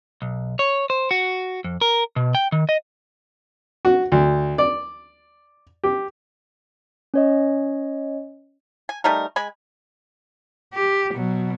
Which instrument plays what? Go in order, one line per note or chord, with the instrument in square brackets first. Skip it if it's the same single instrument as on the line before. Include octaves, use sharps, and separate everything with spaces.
[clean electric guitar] B1
C#5
C5
F#4
F2
A#4
B2
G5
D#3
D#5
[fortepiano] F#4
D2
D5
G4
[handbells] C#4 C#5 D#5
[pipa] G#5
G3 A3 D#4 A#4
G#3 G#5 B5
[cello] G4
B2 F#3